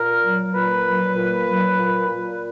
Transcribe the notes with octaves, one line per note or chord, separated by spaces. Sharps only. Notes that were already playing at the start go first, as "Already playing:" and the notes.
Already playing: A#2 A#4
F#3
A#2 B4
F#3
A#2
F#3
A#2
A#2